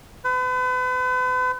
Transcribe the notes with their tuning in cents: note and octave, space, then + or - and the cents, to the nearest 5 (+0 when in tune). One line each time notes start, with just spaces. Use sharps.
B4 +40